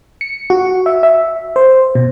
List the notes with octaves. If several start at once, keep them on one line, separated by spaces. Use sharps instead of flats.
C#7
F#4
E5
E5
C5
B2